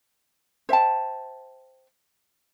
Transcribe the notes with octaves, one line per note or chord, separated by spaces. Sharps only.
C5 E5 G5 A5